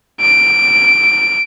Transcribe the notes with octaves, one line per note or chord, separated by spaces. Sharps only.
D7